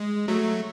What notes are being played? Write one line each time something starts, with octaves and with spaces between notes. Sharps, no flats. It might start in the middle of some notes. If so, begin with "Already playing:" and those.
Already playing: G#3
F#3 A3